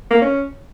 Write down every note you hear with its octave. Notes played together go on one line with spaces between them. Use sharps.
A#3
C#4